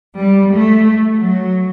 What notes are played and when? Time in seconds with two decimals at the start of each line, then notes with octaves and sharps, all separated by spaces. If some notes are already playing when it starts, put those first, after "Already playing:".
0.18 G3
0.53 A3
1.16 F#3